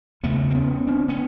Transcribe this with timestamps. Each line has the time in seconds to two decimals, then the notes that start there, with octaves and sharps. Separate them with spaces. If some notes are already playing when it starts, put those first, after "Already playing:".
0.23 E2 C#3 A3 B3
0.50 C4
0.55 B3 C#4
0.87 C4 D4
1.08 B3 C#4